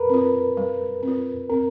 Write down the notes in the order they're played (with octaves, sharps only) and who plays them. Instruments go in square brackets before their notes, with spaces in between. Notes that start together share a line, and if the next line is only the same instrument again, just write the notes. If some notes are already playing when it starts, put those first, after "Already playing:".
Already playing: [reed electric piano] A#4 B4
[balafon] C4 F4
G3
C4 F4
[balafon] C4 [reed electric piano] A#4